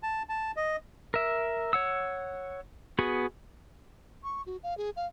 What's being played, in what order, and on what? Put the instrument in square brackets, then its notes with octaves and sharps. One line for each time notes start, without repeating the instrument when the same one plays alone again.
[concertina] A5
A5
D#5
[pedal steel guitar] A#4 E5
C#5 F#5 E6
B3 F#4 G#4
[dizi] C#6
F#4
F5
G#4
F5